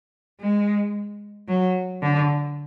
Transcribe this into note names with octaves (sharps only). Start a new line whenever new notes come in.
G#3
F#3
D3